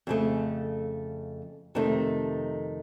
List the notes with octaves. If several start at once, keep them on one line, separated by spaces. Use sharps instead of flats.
F2 C#3 A3
F2 C3 D#3 A3 D#4